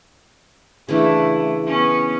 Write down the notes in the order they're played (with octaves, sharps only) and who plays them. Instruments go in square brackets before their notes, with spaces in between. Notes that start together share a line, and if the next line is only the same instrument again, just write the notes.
[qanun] C#3 E3 D4 [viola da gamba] A3 E4
[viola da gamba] B3 C#4